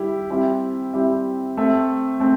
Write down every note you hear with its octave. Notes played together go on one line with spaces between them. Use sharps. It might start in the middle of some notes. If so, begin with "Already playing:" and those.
Already playing: G3 E4 G4
G3 C4 E4 G4 E5
G3 C4 E4 G4 E5
A3 C4 A4 E5
A3 C4